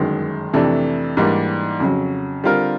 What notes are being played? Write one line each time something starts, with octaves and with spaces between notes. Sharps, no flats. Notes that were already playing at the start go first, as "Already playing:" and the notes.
Already playing: G1 F#2 D#3 G#3
F2 C3 E3 A3 D4
G#2 E3 G3 A#3 D4
F2 C#3 F#3
D3 G3 C4 F4 A#4